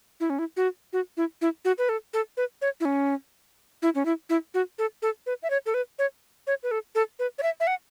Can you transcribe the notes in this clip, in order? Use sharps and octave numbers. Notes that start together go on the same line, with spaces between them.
E4
C#4
E4
F#4
F#4
E4
E4
F#4
B4
A4
A4
B4
C#5
E4
C#4
E4
C#4
E4
E4
F#4
A4
A4
B4
E5
C#5
A4
B4
C#5
C#5
B4
A4
A4
B4
C#5
E5
E5
F#5